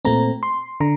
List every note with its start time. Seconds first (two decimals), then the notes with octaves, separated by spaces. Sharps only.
0.05 A#2 A3 C4 A#5
0.43 C6
0.80 D3 A#5